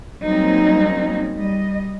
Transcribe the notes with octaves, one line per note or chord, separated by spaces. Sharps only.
F#3 G3 A#3 C4 C#4 D#4
G3 D#5